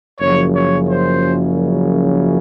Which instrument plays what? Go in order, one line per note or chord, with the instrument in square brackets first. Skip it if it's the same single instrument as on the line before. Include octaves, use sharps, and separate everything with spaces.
[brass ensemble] F#1 F#2 C#3 F3 C#5
C#5
C5